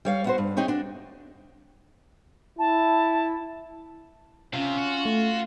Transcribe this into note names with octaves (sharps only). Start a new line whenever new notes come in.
G3 C#5 F5
B3 F#4 C5
G2
C4 D#4 G4 C#5
D4 F#4
E4 A5
C3 C#4 F4
F#4
A3